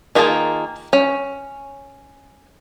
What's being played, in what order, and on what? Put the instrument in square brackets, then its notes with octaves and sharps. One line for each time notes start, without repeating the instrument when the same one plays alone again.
[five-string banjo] D#3 A#3 F4 G#4 A5
C#4